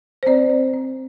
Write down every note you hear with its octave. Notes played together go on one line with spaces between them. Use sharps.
C5
C4 D5
C4
C4